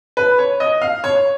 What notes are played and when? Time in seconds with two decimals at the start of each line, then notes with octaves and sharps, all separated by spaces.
0.17 B4
0.39 C#5
0.60 D#5
0.82 F5
1.04 C#5